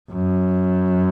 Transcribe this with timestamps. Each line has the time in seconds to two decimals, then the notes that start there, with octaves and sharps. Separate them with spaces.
0.12 F#2